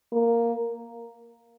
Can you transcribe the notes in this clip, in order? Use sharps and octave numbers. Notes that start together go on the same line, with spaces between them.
A#3